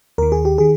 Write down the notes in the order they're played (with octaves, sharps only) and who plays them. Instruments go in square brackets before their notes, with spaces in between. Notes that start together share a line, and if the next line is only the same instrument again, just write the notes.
[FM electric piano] D#2 D#3 A#4
G#4
G4
D#3 G#4